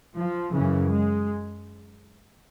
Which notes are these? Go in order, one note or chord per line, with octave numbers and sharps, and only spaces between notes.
F3
F#2 C#3 E3
G#3